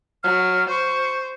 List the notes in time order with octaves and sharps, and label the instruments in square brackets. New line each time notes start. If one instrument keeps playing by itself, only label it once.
[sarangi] F#3 [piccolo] F6
[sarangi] C5 [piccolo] C#6